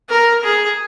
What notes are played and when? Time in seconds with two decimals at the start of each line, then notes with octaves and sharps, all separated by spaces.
0.09 A#4
0.44 G#4